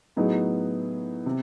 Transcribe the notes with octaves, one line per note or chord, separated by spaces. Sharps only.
A2 F#3 B3 D#4 G#4
C3